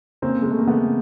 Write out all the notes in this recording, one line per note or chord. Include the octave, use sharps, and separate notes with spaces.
C#3 A#3 C4
C#3 G#3
A3
A#3
C#3 A3 B3